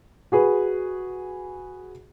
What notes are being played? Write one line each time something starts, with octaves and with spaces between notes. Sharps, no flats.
F#4 G#4 B4